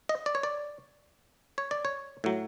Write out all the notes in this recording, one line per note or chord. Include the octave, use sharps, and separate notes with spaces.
D#5
D5
C#5
D5
C#5
D5
C#5
A2 F#3